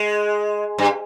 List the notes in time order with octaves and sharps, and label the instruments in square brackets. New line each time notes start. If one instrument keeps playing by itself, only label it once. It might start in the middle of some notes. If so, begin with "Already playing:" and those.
Already playing: [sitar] G#3
G2